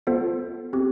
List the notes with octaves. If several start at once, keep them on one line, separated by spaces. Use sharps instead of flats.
B3 F4 A4 C5
C4 G4